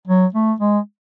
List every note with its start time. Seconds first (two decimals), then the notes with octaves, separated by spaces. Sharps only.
0.08 F#3
0.34 A3
0.60 G#3